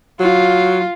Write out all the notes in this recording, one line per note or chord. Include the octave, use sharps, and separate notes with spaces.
F#3 F4